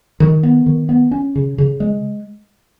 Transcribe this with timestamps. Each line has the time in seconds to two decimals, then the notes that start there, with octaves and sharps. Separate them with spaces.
0.20 D#3
0.43 B3
0.66 D#3
0.89 B3
1.11 C#4
1.35 C#3
1.58 C#3
1.80 G#3